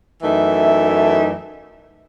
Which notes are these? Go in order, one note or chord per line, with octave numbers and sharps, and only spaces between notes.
F#2 E3 A3 D#4 E5